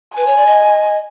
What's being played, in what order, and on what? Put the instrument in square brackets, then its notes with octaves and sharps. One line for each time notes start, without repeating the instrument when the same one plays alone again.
[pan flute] B4 [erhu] G#5
[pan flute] C#5
D5
D#5